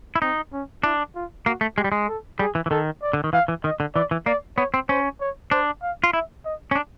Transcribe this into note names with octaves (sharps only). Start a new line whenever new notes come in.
E4
C4 D#4
C#4
D4 E4
F4
A#3 F#4
A3
G#3 G4
G3
G#3
A4
G3 G#4
E3
E3
D#3 A4
D5
D3
D#3
E3 F5
E3
D#3 D#5
D3
E3 D5
E3
A#3 D5
B3 C#5
C4
C#4 C5
C#5
D4 C5
F5
F4
E4 E5
D#5
C#4
D4